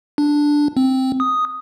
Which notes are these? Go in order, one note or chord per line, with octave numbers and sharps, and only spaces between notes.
D4
C4
D#6